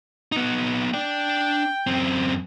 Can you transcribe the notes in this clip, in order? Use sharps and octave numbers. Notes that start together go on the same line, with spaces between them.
B3 D#4
D4 D5 G5
F#2 C4